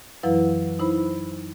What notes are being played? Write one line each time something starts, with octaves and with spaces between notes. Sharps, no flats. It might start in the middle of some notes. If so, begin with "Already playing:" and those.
F#2 E3 F#3 E4 B4 F5
D#4 E4 C5 B5